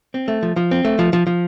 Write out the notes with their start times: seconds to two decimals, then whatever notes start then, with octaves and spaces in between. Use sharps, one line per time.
0.14 C4
0.28 A3
0.43 F3
0.56 F3
0.71 C4
0.85 A3
0.99 F3
1.13 F3
1.27 F3